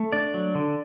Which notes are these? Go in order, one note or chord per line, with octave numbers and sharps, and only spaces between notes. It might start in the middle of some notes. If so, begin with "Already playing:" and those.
Already playing: A3
D4 D5
F#3
D3